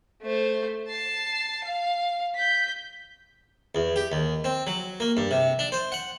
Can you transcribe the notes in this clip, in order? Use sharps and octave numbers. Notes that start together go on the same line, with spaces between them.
A3 C5
A5 C7
F5
G6 B6
E2
G4
D#2
C4
F#3
A#3
G2
C3
D4
C5
F#5